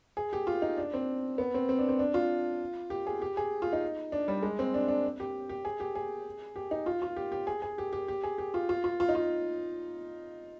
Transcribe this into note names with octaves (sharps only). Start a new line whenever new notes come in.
G#4
G4
F4
D#4
D4
C4
B3
C4
C4
D4
C4
D4
F4
G4
G#4
G4
G#4
F4
D#4
D4
G3
G#3
C4
D4
D4
G4
G4
G#4
G4
G#4
G4
D#4
F4
F4
G4
G4
G#4
G#4
G4
G4
G4
G#4
G4
F4
F4
F4
F4
D#4
F4